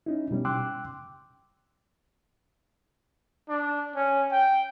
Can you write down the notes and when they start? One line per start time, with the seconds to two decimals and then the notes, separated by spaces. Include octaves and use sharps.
0.06 C#4 D#4 E4
0.31 B2 G3 C#4
0.45 G5 C6 D6 E6 F#6
3.49 D4
3.96 C#4
4.32 G5